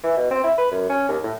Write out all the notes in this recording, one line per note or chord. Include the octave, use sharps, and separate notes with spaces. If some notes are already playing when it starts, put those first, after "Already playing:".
E3
B2
C4
E4
B4
F#2
C#4
D#2
A2